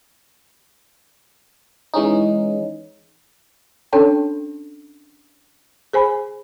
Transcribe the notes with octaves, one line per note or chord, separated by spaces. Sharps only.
E3 G#3 C#4 D#4
C#4 D4 A4 C#5 G5 A5
G#4 C5 G#5 B5